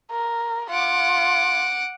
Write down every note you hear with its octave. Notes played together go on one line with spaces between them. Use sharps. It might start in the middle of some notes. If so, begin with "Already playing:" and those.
A#4
F4 F#5 D6